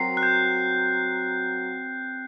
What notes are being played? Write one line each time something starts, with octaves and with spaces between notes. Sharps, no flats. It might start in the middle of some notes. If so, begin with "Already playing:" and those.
Already playing: F#3 C4 F#4 A#4 C7
F#6
G6